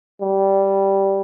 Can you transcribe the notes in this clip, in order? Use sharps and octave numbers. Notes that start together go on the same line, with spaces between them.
G3